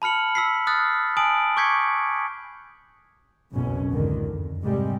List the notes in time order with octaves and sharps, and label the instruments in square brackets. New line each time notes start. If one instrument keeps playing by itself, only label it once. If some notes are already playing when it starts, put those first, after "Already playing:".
[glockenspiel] A5 B5 F6 C#7 F#7
E6 B6 C7
D#6 F6 F#6 A6
G#5 A5 D#6 D7 F#7
C#6 D6 G6 G#6 B6 C#7
[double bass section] F#1 B1 F2 B2 C#4
C#2 G#2 D3 D#3
F2
G#2 C3 G3 G#3